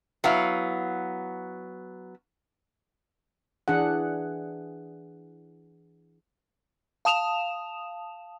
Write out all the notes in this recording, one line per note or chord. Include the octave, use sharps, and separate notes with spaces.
F#3 B3 E4 F5
E3 D4 G#4 F#5
F5 A5 D#6 E7 F7